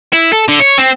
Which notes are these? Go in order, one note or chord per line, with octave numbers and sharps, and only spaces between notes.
E4
A4
D3
C#5
C4